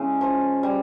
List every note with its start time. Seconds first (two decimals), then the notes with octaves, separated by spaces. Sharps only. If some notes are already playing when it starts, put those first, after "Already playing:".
Already playing: C#3 G#3 E4
0.21 F3
0.63 G3